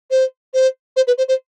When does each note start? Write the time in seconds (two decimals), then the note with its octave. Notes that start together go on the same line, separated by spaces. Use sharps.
0.11 C5
0.54 C5
0.96 C5
1.07 B4
1.18 C5
1.28 C5